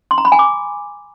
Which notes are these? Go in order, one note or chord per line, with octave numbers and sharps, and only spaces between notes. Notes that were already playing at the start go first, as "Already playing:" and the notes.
C6
A#5
B5
G#5
D6